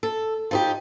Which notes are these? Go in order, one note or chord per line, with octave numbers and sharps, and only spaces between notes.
A4
F3 D#4 G4